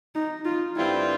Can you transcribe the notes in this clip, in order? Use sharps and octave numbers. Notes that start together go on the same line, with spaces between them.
D#4
F4
G2 D3 G3 C4 E4 F4